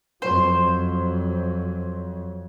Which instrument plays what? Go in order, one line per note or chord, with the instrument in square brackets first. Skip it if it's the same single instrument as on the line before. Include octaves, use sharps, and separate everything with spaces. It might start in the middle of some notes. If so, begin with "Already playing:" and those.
[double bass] F2 F#3 [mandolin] C5